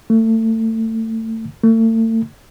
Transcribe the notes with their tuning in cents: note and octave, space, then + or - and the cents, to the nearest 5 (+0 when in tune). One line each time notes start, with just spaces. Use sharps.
A3 +30
A3 +40